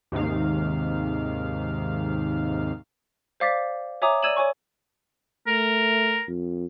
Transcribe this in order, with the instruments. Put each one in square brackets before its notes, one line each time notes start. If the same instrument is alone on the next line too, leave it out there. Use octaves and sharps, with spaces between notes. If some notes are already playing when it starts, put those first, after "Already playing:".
[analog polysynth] D#2 G#2 C3 D#3 F5
[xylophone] C5 D5 F5 D6 A6 B6
C#5 E5 G#5 A#5 D6 D#6
D5 E6 G#6 D#7 E7 F#7
C#5 G#5 C#6
[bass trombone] A3 [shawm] A#4
[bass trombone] F2